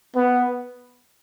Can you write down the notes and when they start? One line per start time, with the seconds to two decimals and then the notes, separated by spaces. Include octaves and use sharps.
0.16 B3